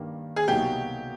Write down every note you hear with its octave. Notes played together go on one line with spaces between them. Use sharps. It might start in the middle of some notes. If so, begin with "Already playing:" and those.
Already playing: G2 D#3 G3 A#3
G#4
C2 B2 F#3 A#3 D#4 G4